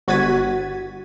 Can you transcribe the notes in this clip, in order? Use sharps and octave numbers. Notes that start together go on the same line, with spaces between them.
G1 F#4 G#6 A6 B6 D#7